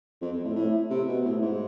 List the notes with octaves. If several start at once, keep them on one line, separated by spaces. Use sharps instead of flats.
F2
F2
A2
A2
C3
B2
A2
G#2